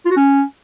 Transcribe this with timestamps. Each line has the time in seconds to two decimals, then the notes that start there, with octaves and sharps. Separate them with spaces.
0.05 F4
0.11 F#4
0.16 C#4